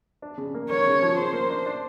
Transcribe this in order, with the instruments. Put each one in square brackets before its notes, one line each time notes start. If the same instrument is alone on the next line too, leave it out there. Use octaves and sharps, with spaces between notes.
[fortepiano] D4
C#3
A#3
[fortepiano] A#3 [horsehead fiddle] C#5
[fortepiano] C#3
F3
[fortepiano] C#3 [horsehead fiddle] C5
[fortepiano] A#3
D4
D4